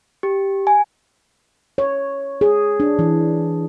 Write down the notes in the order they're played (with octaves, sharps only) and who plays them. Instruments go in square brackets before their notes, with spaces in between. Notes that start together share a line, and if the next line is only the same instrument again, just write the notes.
[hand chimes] G4
G#5
[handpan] C#5
G#4
D4
E3